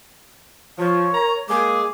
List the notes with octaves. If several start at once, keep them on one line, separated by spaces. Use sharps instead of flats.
F3 C#5
A#4 A#5
G#3 A#3 G#4 D6